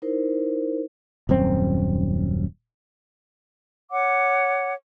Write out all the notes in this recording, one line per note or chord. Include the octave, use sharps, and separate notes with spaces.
D#4 E4 A#4 C5
D#1 F#2 C4
C#5 F#5 D6